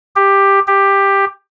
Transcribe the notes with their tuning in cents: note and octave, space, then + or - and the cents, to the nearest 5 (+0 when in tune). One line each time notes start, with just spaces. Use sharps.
G4 +10
G4 +10